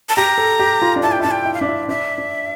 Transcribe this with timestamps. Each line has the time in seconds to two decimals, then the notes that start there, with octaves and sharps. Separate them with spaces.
0.09 A5
0.16 G4 A#5
0.38 A4
0.59 G4
0.82 F4
0.96 D4
1.03 E4 A5
1.12 G5
1.20 D4 E4 A5
1.31 G5
1.45 E4
1.54 F5
1.59 D4 E5
1.67 E4
1.89 D4 E5
2.18 D4